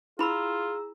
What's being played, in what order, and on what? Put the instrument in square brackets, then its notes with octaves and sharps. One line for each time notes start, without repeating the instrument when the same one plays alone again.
[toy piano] E4 B5 [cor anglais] F4 [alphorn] G#4 [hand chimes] A#5 E6